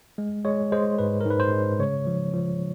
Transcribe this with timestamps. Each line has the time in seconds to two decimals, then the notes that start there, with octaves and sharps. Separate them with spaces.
0.18 G#3
0.45 G#3 C#5
0.72 G#3 C5
0.98 G#2 B4
1.21 A#4
1.26 G#2 B4
1.40 C5
1.53 G#3
1.79 C#3 C#5
2.07 F3
2.34 F3